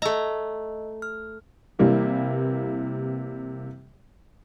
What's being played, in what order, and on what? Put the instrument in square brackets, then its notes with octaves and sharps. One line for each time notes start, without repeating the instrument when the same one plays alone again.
[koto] A3 A#5 [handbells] D#5 E6
[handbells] F6
[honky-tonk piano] C3 E3 G3 A#3 G4